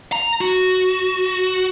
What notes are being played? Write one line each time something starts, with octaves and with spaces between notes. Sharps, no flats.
A#5
F#4